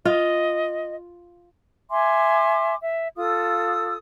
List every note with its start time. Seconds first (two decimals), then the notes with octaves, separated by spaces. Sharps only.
0.05 F4 D#5
1.89 E5 G#5 C6 D6
2.80 E5
3.17 F4 A4 D#6 E6